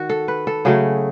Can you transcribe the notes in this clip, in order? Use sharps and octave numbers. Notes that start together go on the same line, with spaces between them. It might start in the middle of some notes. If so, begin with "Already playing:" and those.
Already playing: D#3 F#4
A4
B4
A4
C#3 F#3 A3 G#4